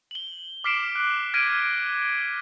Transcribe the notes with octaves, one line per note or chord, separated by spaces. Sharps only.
F#7 G7
D6 F6 B6 C7 D7 E7
F#6
F6 G#6 A#6 B6 D7 D#7